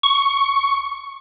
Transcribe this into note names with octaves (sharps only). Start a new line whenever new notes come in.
C#6